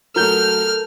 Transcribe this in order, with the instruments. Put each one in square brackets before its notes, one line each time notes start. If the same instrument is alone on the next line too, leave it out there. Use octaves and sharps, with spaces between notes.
[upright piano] F#3 A3 [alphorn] A4 [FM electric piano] A#4 G6 [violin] F6